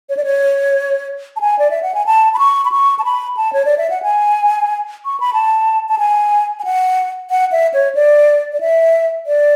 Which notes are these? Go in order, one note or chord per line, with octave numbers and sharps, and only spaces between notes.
C#5
D5
C#5
A5
G#5
D5
E5
F#5
G#5
A5
B5
C#6
B5
C#6
A5
B5
A5
C#5
D5
E5
F#5
G#5
C#6
B5
A5
A5
G#5
G#5
F#5
F#5
E5
C#5
D5
D5
E5
D5